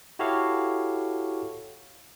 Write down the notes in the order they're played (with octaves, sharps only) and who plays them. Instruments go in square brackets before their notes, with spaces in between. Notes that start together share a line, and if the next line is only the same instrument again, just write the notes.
[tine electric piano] E4 F#4 G4 A4 C#5 F5